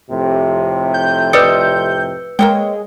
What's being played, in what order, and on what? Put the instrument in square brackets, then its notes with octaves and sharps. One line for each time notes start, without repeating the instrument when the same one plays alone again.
[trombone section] F2 A2 C3
[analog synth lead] G6
[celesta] B4 E6 C#7 [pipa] D5 D#5
[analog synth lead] G#3 [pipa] A#3 C#5 G5